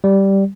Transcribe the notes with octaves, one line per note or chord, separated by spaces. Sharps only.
G3